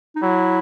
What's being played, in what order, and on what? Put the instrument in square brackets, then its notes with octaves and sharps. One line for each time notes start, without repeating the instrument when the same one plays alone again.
[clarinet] D#4
[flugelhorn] F#3 [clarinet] E4